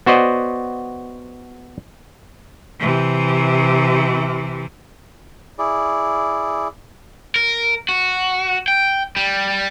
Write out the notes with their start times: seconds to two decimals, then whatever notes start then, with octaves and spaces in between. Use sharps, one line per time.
0.06 B3 F#4 C5 D5 D#5
2.80 C3 E3
5.59 E4 G#4 D5
7.36 A#4
7.89 F#4
8.68 G5
9.17 G3